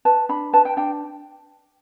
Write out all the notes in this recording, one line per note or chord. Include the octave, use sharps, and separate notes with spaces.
B4 A5
D4 B5
B4 A5
G5
D4 G5